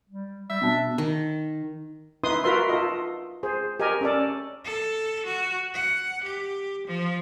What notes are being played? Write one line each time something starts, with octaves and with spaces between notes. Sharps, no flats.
G3
G3 E5
B2 D4 A5
D#3
D#4 E4 B4 C6 D#6
F4 F#4 A#4 B4 E5 C6
F4 A4 D#5
G#4 C5
G4 A#4 D#5 G#5
C#4 A4 D5
A4
F#4
F#5
G4
F3